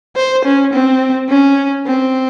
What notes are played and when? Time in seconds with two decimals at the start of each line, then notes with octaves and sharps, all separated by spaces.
0.16 C5
0.45 C#4
0.73 C4
1.29 C#4
1.86 C4